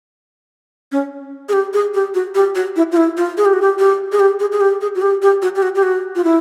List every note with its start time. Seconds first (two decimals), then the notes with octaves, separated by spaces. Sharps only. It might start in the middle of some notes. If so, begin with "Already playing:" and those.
0.92 C#4
1.49 G#4
1.53 G4
1.73 G#4
1.94 G4
2.14 F#4
2.35 G4
2.55 F#4
2.76 E4
2.92 F4
2.97 E4
3.17 F4
3.38 G#4
3.45 G4
3.53 F#4
3.62 G4
3.79 G4
4.12 G#4
4.20 G4
4.40 G#4
4.52 G#4
4.61 G4
4.81 G#4
4.95 F#4
5.02 G4
5.22 G4
5.42 F#4
5.55 G4
5.62 F#4
5.75 G4
5.83 F#4
6.16 F4
6.24 E4